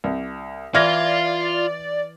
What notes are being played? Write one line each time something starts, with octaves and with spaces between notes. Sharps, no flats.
C2
E3 F4 D5 F6 G#6 A#6